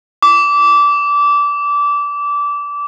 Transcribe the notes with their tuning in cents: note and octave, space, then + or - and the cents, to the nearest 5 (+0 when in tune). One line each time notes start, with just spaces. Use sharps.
D6 -20